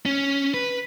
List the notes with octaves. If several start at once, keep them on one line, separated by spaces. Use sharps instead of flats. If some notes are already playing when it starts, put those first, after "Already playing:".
C#4
B4